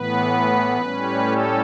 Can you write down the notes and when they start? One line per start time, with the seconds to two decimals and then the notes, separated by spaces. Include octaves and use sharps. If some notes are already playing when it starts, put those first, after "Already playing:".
Already playing: A2 E3 B3 B4
0.82 A2 G3 C#4
1.26 A4